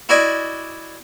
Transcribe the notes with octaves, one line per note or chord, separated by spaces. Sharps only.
E4 F#4 D5 D#5 G#5